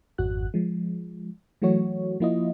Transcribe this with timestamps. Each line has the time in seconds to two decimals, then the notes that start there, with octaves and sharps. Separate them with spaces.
0.18 G#1 F2 F#4 F#6
0.54 F3 G#3
1.62 E3 F#3 A3 F#4 C#5
2.20 F3 A#3 E4 F4 D#5